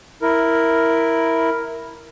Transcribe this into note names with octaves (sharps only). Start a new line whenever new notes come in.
E4 A#4